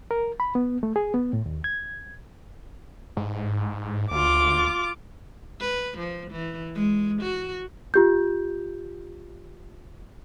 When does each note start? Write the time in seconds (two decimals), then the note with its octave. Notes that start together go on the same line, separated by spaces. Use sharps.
0.11 A#4
0.40 B5
0.55 B3
0.83 A3
0.96 G#4
1.14 B3
1.33 A2
1.46 D#2
1.64 G#6
3.17 G#2
4.11 D2 F4 D6
5.60 B4
5.98 F3
6.31 E3
6.75 G#3
7.22 F#4
7.94 F4 G4 G6